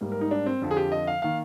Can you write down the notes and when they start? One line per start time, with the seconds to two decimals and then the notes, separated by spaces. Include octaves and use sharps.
0.01 G#2 G3 A#3
0.12 A#4
0.21 D#4
0.31 D4
0.46 C4
0.62 F2 D3 F3
0.71 G#4
0.77 G4
0.92 D#5
1.07 F5
1.22 D#3 A#3 F5